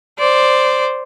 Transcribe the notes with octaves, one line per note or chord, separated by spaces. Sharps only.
C5 D5